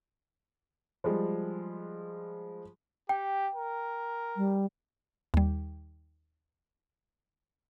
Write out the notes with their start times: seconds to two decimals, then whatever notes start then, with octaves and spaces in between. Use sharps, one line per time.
1.04 F3 G3 G#3
3.09 G4 G5
3.55 A#4
4.37 G3
5.34 D#2 G3